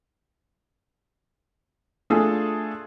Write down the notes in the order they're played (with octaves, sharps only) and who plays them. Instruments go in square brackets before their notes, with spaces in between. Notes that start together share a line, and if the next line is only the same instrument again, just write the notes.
[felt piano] A3 D4 F4 G#4 A4